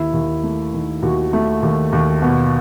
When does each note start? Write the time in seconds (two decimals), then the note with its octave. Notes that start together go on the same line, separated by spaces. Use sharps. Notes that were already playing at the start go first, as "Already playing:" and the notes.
Already playing: D#2 E4
0.13 D#2
0.43 A3
0.73 D#3
1.02 D#2 F#4
1.33 A3
1.63 D#2
1.92 D#2
2.22 B2